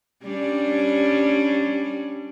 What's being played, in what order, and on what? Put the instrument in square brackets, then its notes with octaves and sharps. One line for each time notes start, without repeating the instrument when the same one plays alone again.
[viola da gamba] G3 C#4 D4